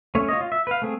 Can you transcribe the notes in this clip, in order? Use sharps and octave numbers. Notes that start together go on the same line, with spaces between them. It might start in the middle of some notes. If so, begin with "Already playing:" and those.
A3 C#4 C#5
F4 C#5 D#5
F4
E5
B4 F5
A3 C4 G#4